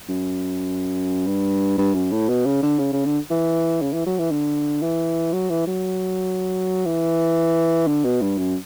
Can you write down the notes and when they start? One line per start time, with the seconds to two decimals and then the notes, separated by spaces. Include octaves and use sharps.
0.09 F#2
1.26 G2
1.78 G2
1.95 F#2
2.11 A2
2.29 B2
2.46 C#3
2.62 D3
2.79 C#3
2.93 C#3
3.05 D3
3.30 E3
3.81 C#3
3.93 E3
4.06 F#3
4.19 E3
4.31 D3
4.82 E3
5.33 F#3
5.50 E3
5.67 F#3
6.85 E3
7.87 D3
8.04 B2
8.22 G2
8.38 F#2